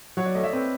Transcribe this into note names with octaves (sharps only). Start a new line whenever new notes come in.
F#3 C#5
D5
A3 D#5
E5
C4 B4